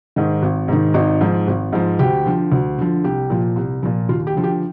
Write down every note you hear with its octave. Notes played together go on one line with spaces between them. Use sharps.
G#2 D#3
G#1
G#2 D#3
G#1 D#4
G#2 F3
G#1
G#2 F3
D2 G4
D3 F3
D2
D3 F3
C2 G4
A#2 F3
C2
A#2 F3
D#2 F4
G4
D3 F3
G4